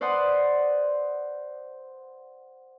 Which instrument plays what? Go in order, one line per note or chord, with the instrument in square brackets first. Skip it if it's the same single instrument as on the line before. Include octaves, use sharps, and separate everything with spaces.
[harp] B4 C5 D5 F#5 C6 D#6